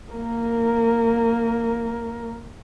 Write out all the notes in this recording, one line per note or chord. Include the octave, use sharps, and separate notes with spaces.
A#3 A#4